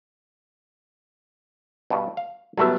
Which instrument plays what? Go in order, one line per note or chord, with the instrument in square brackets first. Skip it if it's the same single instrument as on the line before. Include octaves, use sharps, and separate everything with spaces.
[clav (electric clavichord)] G2 B2
F5
[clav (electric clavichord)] D3 A3 E5 [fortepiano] F#3 G3 B3